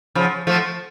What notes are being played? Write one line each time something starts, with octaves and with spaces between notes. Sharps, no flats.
C#3 F3
F3 A3